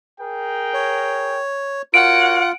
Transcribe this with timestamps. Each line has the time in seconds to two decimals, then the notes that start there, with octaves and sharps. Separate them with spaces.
0.20 G#4 A#4 G5
0.74 C#5
1.94 F4 F#4 A#4 C#5 F#5 D7